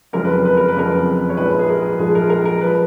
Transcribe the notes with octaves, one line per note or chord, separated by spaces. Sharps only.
F#1 F2 F3 G#3 A#4
B4
A#4
B4
A#4
B4
F#1 F2 F3 G#3 A#4
C#5
A#1 G#2 F3 G#3 B4
G#4
A#4
A#1 G#2 F3 G#3 G#4
A#4
A#4
A#4
F3 G#3 B4